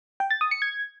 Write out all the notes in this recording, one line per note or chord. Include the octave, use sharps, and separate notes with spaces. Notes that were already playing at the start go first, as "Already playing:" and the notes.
G5
A6
D#6
C#7
G#6